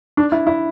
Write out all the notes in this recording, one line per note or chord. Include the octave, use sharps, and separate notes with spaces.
D4
E4
E4